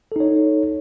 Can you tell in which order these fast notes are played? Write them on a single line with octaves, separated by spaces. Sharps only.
A4 D#4 C#5